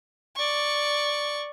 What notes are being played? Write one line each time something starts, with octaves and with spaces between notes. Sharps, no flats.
D5 C#6